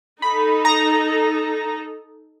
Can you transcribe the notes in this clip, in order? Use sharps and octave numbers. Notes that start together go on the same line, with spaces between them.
D#4 A4 B5
A#5